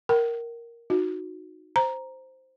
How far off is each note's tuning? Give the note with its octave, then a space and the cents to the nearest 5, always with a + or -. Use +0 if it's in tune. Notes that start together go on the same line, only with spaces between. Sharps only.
A#4 +0 G5 -45
D#4 -5 F#4 -20
C5 +0 A#5 +5